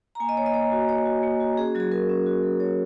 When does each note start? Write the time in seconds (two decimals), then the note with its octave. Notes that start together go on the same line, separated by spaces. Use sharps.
0.15 A#5
0.20 A#3 G#5
0.29 D#5
0.37 A#3 C#5
0.46 D#5
0.54 A#3 C#5
0.72 F#4
0.89 A#3 C#5
1.06 F#4
1.23 A#3
1.40 F#4
1.57 C#4 G#4
1.75 F#3 F#4
1.80 G#4
1.92 F#4 A#4
2.09 C#4
2.26 F#4
2.44 F#3
2.60 F#3 C#5